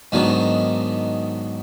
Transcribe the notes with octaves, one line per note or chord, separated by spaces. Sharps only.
G#2 D#3 F#3 B3 D4